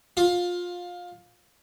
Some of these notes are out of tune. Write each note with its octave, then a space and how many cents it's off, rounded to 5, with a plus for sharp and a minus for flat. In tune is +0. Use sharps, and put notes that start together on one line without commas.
F4 +20